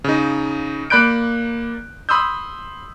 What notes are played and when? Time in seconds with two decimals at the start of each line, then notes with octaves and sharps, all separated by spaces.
0.04 C#3 D#4
0.90 A#3 D5 B5 F#6 G6 D7
2.09 B5 C6 D#6 E6 G6